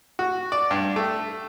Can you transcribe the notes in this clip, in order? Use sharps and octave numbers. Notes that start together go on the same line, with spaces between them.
F#4
D5
G2
A3